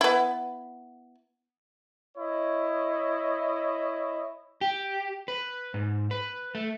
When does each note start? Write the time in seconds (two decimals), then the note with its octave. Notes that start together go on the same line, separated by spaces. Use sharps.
0.01 B3 E4
2.16 E4 C#5 D#5
4.61 G4
5.28 B4
5.74 G#2
6.11 B4
6.55 A3